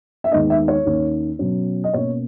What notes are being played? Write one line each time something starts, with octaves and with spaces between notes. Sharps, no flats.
E5
D#2 D#3 G#3 B3 D#5
E5
C#5
D#2 D#3 A#3 C#4
B2 F#3 C#4
D#5
B2 A#3 C#4 C#5